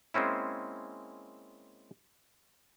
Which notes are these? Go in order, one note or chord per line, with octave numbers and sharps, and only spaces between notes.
G#3 A#3 C4 C#4 E4